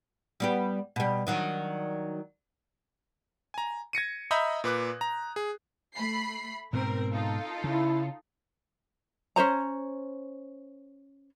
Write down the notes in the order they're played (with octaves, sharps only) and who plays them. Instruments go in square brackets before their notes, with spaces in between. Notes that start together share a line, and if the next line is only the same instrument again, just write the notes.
[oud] G3 B3 G4
B2 G3
D#3 F#3 D4
[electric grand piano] G#5 A#5
G#6 A#6 C#7 D#7
D#5 E5 A#5 B5 D#6 G6
A#2 B4 D6 F#6
A#5
G#4
[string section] A3 B5 C7
[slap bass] G#2 B2 [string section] C4 A#4
[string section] D#4 F4 A4
[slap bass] C#3 [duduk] E4
[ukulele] C#4 D4 C5 A#5